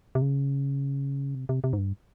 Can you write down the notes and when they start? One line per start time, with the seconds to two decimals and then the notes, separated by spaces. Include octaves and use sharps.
0.15 C3
0.22 C#3
1.35 C3
1.49 C3
1.64 C3
1.73 G#2
1.78 G2